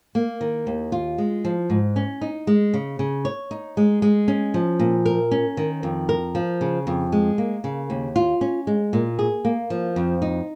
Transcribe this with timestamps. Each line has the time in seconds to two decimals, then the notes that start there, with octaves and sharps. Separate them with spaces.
0.15 A#3
0.41 D#3
0.67 D#2
0.92 F4
1.18 G#3
1.45 F3
1.70 G#2
1.96 C#4
2.21 D#4
2.47 G#3
2.74 C#3
2.99 C#3
3.25 C#5
3.51 D#4
3.77 G#3
4.02 G#3
4.28 C#4
4.54 F3
4.79 A#2
5.05 A#4
5.31 C#4
5.57 D#3
5.83 F2
6.09 A#4
6.35 F3
6.61 C#3
6.87 F2
7.12 G#3
7.38 A#3
7.64 C#3
7.90 D#2
8.16 F4
8.41 C#4
8.67 G#3
8.93 A#2
9.19 G#4
9.45 A#3
9.70 F3
9.96 F2
10.22 D#4